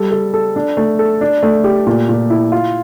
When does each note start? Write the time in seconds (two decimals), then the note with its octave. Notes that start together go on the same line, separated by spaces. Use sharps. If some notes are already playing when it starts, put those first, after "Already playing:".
Already playing: G3 A4
0.11 A4
0.34 A4
0.56 D4
0.77 A3
0.99 A4
1.21 D4
1.43 A3
1.64 G4
1.87 A#2
2.09 A#2
2.30 E4
2.52 F4